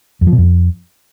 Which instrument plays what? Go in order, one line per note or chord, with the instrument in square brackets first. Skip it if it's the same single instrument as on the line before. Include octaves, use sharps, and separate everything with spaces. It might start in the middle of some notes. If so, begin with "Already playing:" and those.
[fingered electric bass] F2
F3
B2
F2